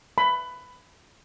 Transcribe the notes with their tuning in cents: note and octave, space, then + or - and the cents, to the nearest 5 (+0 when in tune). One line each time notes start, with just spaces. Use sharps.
B5 +15